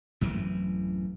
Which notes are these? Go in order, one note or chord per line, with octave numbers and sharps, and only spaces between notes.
A1 F#2 C3 E3